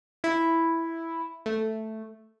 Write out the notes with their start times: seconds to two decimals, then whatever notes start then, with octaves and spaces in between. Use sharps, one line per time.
0.24 E4
1.46 A3